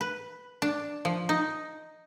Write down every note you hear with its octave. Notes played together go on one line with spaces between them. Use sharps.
B4
D4
F3
D#4